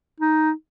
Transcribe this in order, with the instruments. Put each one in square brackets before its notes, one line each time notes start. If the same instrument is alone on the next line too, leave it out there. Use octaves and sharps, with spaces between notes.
[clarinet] D#4